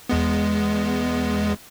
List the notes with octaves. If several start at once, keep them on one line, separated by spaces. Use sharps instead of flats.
E2 G#3 B3